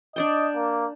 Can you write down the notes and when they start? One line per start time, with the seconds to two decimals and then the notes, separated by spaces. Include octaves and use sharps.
0.16 D4 D5 D#5 G5
0.55 A#3